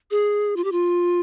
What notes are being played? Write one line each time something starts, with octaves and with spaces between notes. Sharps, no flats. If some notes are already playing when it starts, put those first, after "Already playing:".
G#4
F4
G4
F4